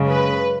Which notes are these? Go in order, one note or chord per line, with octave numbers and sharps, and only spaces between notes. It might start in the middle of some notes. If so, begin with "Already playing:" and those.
Already playing: F#2 C#3 G#3
B4